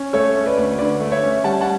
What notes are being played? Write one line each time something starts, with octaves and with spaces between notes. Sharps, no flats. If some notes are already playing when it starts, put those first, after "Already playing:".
Already playing: C#4
A3 A4 C#5
C#4
B4 D5
D2
D3 B4 D5
A3
C#5 E5
C#4
G3 F#5 A5
F#5 A5